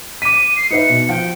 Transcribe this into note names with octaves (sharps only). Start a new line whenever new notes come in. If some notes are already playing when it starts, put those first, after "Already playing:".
D6 B6 D#7
C7
D#4 B4 E5 C#7
B2
F3 G5